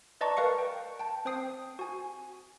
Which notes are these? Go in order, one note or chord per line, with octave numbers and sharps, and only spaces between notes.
B4 D5 D#5 A5 A#5 C#6
A#4 B4 F5 C#6 C#7
G5
G5 A5
C4 C5 G5 D#6 C7
F#4 G#5